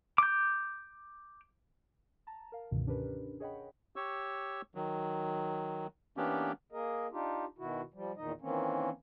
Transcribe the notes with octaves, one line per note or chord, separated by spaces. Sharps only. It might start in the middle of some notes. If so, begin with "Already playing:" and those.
D6 G6
A5 A#5
A#4 F5
C#2 G2 B2 D3 D#3
C#4 D4 G4 A#4 B4
G#4 C#5 D#5 F#5 G5 B5
G4 C#5 C#6 E6
D#3 F#3
E3 A#3 B3 C#4 D4 G4
A#3 G#4 A#4 D#5
D4 D#4 F4 G4
B2 D#3 E4 F#4
F3 G3
E2 A#2 D#3 D#4 D#5
D#3 E3 A#3 C4 C#4